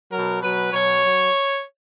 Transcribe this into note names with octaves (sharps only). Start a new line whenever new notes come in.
B2 F#3 A#4
B2 F#3 B4
B2 F#3 C#5
F#3